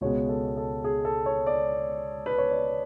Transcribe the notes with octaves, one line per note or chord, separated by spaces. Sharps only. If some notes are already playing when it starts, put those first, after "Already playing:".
C#2 B2 G#3 B3 C#5
A4
A4
G#4
A4
C#5
D5
B4
C#5
D5